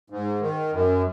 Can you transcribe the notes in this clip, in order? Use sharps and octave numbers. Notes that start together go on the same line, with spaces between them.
G#2
D#3
F#2